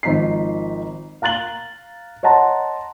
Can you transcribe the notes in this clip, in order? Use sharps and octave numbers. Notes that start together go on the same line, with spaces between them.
G#1 F3 D#4 B6 C7
F5 A#5 F#6 A6 F#7 G7
C#5 D#5 F#5 A5 A#5 C6